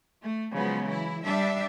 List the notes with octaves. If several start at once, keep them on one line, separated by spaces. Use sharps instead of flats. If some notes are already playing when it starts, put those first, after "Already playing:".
A3
C#3 F3 F#3 G#3 B3
E3 E4
G3 D4 E5